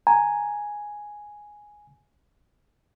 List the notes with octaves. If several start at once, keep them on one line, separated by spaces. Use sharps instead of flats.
G#5 A#5